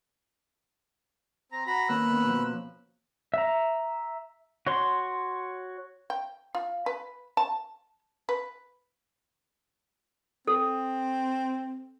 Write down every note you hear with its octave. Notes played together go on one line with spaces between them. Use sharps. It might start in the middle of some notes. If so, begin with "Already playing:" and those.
C4 A#5
F#4 A#5 B5
D#3 A#3 C#4 B4 E6 F#6
D#3 B3 C#4
B2 F3
E5 A#5
F#4 C#5 C6
G5
F4
B4
A5
B4
C4 A4